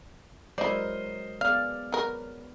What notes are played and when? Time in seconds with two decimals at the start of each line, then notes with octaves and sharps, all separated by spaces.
0.58 F#3 G#3 E4 A#4 C5 D5 D#5
1.41 B3 G#4 D5 F5 F6
1.92 F#3 A#4 B4